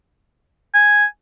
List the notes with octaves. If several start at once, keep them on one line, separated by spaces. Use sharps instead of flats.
G#5